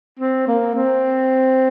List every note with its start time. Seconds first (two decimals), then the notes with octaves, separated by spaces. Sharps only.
0.20 C4
0.48 A#3
0.75 C4